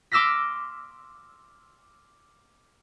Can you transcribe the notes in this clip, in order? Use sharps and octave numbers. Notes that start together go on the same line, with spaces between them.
C6 D6 E6 F6 A#6 B6